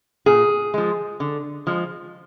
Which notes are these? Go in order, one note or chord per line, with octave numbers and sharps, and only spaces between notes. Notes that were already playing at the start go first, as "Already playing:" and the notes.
A#2 G#4
F3 G#3
D3
F3 G#3